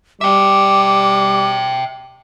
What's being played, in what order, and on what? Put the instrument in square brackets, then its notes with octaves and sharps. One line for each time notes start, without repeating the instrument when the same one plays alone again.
[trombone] G3 [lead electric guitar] E5 G5 [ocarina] D6